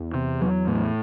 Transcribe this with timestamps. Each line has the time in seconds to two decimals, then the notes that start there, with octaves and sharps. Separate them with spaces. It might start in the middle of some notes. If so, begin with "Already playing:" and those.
Already playing: E2
0.14 C3
0.41 F#3
0.68 A2